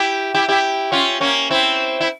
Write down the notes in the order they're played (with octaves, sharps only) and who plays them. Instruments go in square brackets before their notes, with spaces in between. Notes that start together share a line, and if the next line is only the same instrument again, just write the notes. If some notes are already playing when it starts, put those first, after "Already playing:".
Already playing: [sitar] E4 G4
E4 G4
E4 G4
C#4 F4
A#3 C#4
C4 E4
E4